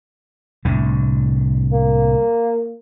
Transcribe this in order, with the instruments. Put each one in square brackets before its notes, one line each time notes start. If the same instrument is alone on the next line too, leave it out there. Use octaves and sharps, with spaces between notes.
[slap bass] C2 A2 D3
[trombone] A#3